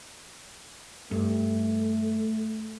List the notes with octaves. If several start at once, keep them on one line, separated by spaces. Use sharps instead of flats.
G2 A3